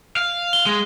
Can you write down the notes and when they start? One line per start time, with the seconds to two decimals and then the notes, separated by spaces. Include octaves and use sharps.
0.17 F5
0.53 G7
0.66 G#3